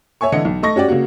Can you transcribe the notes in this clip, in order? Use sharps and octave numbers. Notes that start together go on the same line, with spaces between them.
C#5 E5 G#5 C#6
D3 E3 E4 D#5 C#7
B1
A3 A4 D#5 C#6 A#6
C#4 F#4 G4 D5
C#3 F#3 A#3 F#4